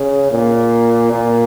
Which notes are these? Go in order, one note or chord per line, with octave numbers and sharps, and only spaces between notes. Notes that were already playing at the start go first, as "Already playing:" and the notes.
Already playing: C#3
A#2
A#2